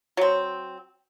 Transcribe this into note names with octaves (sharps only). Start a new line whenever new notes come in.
F#3 C4